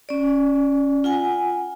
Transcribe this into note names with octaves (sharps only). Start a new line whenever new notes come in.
C#4 D5
F4 F#5 G#5